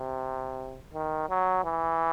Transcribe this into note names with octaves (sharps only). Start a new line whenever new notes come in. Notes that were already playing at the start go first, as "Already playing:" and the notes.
Already playing: C3
D#3
F#3
E3